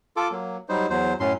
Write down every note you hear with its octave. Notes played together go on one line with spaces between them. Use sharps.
F4 A4 D6
F#3 A#3
F#3 G3 D#4 C5
E2 F#3 C5
F#2 A2 F#3 C#4 C6